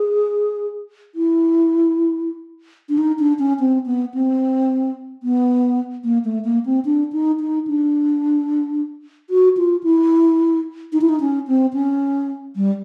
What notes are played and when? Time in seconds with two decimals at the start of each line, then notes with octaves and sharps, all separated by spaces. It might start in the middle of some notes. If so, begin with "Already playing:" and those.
Already playing: G#4
1.15 E4
2.89 D4
2.98 D#4
3.19 D4
3.39 C#4
3.60 C4
3.86 B3
4.14 C4
5.23 B3
6.04 A#3
6.25 A3
6.45 A#3
6.66 C4
6.85 D4
7.13 D#4
7.40 D#4
7.67 D4
9.30 F#4
9.57 F4
9.84 E4
10.93 D#4
11.01 E4
11.09 D#4
11.21 C#4
11.48 C4
11.74 C#4
12.56 G3